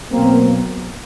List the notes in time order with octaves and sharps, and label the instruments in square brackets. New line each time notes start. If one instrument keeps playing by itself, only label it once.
[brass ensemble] B2 F#3 A#3 C4